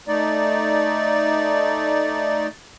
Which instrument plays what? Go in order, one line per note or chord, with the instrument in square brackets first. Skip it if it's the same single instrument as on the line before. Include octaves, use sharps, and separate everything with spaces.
[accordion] A3 D#4 D5